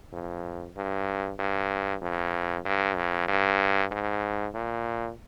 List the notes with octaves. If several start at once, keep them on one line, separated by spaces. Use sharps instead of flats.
F2
G2
G2
F2
G2
F2
G2
G#2
A#2